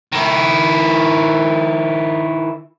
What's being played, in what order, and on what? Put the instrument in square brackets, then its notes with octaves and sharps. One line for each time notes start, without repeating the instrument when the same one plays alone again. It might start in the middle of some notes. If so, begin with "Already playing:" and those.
[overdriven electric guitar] D#3 E4